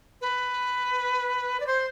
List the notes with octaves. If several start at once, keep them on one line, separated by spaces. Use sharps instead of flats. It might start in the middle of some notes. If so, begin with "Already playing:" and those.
B4
D5
C5